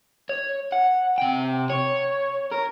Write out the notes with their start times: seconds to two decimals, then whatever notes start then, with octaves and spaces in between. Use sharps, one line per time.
0.29 C#5
0.73 F#5
1.18 C3 G5
1.70 C#5
2.52 A#4